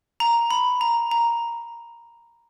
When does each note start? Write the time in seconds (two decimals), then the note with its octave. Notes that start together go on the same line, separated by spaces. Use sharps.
0.20 A#5
0.51 B5
0.81 A#5
1.11 A#5